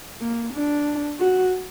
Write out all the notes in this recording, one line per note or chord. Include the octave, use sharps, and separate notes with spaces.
A#3
D4
F#4